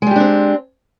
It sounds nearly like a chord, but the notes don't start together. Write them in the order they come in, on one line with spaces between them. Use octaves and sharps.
G#3 G3 G4 D4 C4